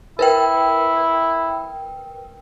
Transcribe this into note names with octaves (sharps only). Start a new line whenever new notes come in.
E4 A#4 B4 G5